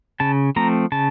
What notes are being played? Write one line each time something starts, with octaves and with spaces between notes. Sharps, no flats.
C#3 A5
F3 A3 C4 A#5
C#3 A5